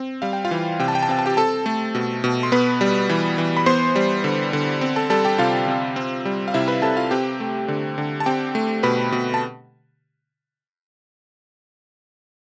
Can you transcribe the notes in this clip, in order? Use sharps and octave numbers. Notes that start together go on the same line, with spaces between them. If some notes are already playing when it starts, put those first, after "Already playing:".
Already playing: C4
G3 F5
G5
F4 F5
E3
C3 G5
A5
G5
A5
C4 G5
A5
G4 G5
C4 A4 A5
A3
B2
B2
C6
B3 B4 B5
G3
E3
E3
B5
B3 C5 C6
G3
D3
D3
C4
A4 A5
G3 A4 A5
G4 G5
C3 F4 F5
C3
C4
G3
F5
C3 E4 E5
B4 B5
C3 A4 A5
F4 F5
C4 G4 G5
A3
D3
D3
A5
C4 G4 G5
A3
B2 B4 B5
B2
A5